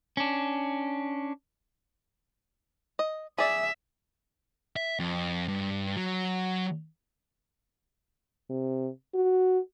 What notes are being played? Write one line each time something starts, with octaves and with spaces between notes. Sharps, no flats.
C#4 D4
D#5
G#4 D5 E5
E5
F2
G2
F#3
C3
F#4